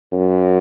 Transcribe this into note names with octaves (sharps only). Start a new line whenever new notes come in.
F#2